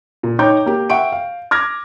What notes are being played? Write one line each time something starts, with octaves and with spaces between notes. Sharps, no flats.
A#2
D#4 C#5 G5 A#5 D6 G6
A#3 G4
E5 F#5 G5 C#6 D7
F5
D6 F6 G#6 A#6